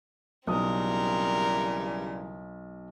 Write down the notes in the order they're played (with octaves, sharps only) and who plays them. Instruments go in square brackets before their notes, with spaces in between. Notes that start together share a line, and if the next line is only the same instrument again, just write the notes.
[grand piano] B1 D#6 [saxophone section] C#3 E3 G3 [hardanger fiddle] C4 A#4